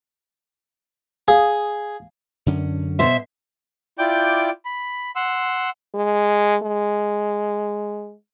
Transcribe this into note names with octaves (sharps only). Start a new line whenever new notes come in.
G#4 F5 D#6
F#2 D3 C#4
B2 C5 E5
E4 F4 D5 G5 D6 G6
B5
F#5 C6 E6
G#3
G#3